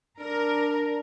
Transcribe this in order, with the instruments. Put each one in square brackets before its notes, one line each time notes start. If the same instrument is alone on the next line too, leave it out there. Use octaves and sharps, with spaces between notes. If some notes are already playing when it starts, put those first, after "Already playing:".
[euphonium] D4 [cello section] A#4